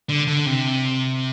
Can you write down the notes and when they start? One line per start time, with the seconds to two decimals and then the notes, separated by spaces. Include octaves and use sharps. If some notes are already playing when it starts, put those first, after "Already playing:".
0.09 D3
0.27 D3
0.46 C3